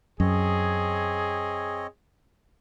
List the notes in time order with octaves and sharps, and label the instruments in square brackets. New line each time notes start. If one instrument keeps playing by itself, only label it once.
[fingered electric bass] F#2 [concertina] C4 C#5 D#5 [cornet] G#4